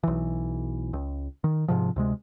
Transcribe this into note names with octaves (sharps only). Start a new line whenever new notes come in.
B1 E3
C#2
D#3
G#2 C3 F3
D2 C3 G#3